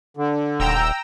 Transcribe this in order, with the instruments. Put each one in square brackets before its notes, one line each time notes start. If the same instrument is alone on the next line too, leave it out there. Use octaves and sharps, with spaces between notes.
[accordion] D3
[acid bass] D#1 [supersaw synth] G5 A#5 E6